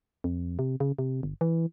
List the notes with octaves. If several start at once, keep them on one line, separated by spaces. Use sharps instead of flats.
F2
C3
C#3
C3
G1
E3